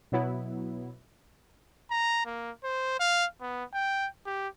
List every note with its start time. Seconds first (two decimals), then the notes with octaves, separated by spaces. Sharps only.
0.12 B2 F#3 B3 E4
1.91 A#5
2.26 A#3
2.64 C5
3.00 F5
3.41 B3
3.73 G5
4.26 G4